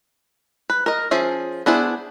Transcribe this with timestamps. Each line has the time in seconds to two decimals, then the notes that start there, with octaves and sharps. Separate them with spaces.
0.70 B4
0.86 A#4 D#5
1.11 F3 C#4 G#4 E5
1.66 B3 D4 E4 G#4 C5